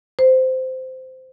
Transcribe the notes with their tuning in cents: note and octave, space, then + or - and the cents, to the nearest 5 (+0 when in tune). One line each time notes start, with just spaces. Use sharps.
C5 -15